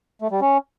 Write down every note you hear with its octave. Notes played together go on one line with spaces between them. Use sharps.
A3
G3
C#4